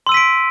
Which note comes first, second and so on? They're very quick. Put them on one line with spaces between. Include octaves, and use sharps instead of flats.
C6 E6 D#7 B6 D7